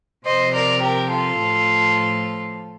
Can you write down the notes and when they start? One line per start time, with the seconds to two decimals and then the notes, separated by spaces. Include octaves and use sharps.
0.25 C3 F3 C5 D#5
0.53 A#4 D5
0.81 G4 A#4
1.10 F4 A4
1.39 A2 F3